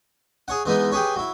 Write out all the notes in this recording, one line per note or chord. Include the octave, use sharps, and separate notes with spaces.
G#4 C#5 F#5
E3 G#3 B3 D#4 E4
G4 G#4 B4 C#5
F#3 E4